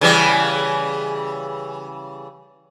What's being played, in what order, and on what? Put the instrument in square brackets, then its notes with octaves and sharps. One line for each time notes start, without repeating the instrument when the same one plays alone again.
[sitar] C#3 E3 G3